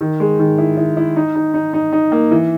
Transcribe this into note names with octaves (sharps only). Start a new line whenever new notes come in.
D#3
G#3
D#3
E4
E4
E4
D#4
D#4
D#4
D#4
D#4
A#3
E3